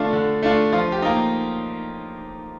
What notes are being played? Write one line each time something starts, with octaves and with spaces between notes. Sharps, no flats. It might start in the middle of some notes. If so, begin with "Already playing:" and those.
Already playing: D3 A3 D4 F4
D3
A3 D4 F4
F3 F4
G4
A#3 D#4